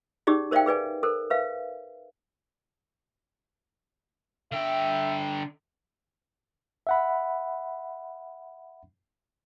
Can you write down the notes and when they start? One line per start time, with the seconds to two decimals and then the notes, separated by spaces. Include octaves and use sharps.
0.27 C#4 D#4 G4 G#4 D5
0.51 A#4 C5 D5 E5 F5 G5
0.66 G#4 B4 D5 G#5
1.03 A4 A#4 C5
1.30 B4 C5 E5 F5
4.52 D3 E5 G5
6.87 E5 F#5 B5